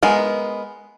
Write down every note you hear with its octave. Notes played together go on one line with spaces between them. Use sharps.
G#3 B3 A#4